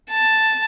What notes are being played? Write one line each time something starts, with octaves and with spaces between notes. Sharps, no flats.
A5